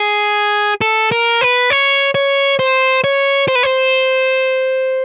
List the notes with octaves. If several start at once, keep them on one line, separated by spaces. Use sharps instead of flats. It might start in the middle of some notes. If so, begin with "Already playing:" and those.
Already playing: G#4
A4
A#4
B4
C#5
C#5
C5
C#5
C5
B4
C5